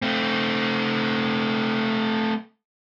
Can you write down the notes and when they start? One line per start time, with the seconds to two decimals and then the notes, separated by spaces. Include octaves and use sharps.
0.02 A3 C4